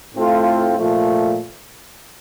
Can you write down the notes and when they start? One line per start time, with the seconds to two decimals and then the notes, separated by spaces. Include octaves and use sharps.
0.15 A2 A3 C4 F4
0.76 A#2 F3 A3